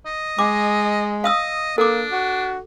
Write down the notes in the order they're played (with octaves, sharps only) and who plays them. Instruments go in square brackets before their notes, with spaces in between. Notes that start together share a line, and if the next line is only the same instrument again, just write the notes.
[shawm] D#5
[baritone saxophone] G#3 [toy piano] D6
[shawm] D#5 [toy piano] F5 D#6 E6
[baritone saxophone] A#3 [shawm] D4 [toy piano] A4 D6
[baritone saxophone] F#4